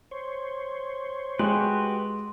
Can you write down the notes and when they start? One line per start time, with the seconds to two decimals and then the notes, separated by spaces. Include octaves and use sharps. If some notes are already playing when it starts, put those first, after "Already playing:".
0.11 C5 C#5
1.39 G#3 F#4 G4 B4 C6